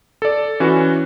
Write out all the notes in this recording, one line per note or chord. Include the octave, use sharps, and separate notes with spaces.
A4 D5
E3 C#4 F#4